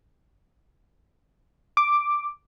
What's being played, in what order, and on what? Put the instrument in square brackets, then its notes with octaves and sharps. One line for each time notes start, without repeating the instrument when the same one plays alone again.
[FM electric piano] D6